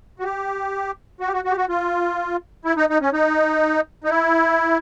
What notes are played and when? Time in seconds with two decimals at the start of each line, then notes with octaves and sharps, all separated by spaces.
0.19 F#4
0.24 G4
1.20 F#4
1.27 G4
1.33 F#4
1.45 F#4
1.51 G4
1.57 F#4
1.69 F4
2.65 E4
2.77 D#4
2.90 D#4
3.02 C#4
3.13 D#4
4.04 D#4
4.10 E4